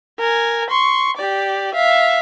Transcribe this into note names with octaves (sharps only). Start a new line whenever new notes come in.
A#4 G#5
C6 C#6
G4 D5
E5 F5